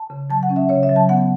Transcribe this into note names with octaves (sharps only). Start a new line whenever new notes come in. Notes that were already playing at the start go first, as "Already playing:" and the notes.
Already playing: A5
C#3
F#3 A5
F#5
C#4
E5
C#3 C#5
E5
F#3
A5
B3 F#5